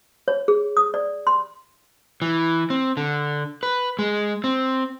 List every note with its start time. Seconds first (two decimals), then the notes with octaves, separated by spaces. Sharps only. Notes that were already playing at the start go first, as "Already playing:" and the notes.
0.28 C#5
0.48 G#4
0.77 D#6
0.94 D5
1.27 C6
2.22 E3
2.70 C4
2.97 D3
3.63 B4
3.99 G#3
4.44 C4